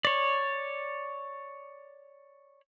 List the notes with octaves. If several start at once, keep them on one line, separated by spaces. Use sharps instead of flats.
C#5 D5